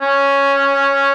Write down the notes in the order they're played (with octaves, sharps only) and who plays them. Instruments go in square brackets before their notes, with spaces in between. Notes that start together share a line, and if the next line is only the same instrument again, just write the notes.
[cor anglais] C#4